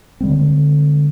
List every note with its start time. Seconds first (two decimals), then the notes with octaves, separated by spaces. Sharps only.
0.21 D3 G3 G#3 C4